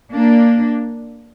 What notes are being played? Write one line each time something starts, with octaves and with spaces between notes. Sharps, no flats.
A#3 D4